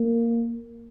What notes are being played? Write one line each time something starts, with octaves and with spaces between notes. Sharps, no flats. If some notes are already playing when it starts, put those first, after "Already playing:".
Already playing: A#3